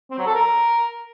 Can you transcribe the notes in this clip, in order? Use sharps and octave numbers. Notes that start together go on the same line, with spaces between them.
C4
F#3
A4
A#4